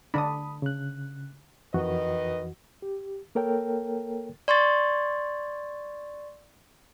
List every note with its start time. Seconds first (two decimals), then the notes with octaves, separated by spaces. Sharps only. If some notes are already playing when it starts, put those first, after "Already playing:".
0.14 D3 D4 B5 D#6
0.62 C#3 F#6
1.74 F2 D#3 E3 F#4 B4 D#5
2.82 G4
3.35 A#3 A4 A#4 C#5 G5
4.48 D5 C6 C#6 A6